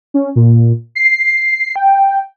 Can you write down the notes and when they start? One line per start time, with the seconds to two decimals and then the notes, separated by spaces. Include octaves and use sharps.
0.14 C#4
0.36 A#2
0.95 C7
1.76 G5